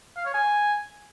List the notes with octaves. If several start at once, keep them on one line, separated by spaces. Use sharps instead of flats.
F5
C#5
G#5